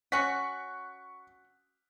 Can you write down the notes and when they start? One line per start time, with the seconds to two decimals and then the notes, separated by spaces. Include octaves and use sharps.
0.12 C#4 F#4 C#6 F#6 B6